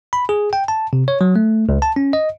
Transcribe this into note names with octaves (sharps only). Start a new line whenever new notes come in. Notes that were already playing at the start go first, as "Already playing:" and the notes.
B5
G#4
G5
A5
C3
C#5
F#3
A3
C#2
A5
C#4
D#5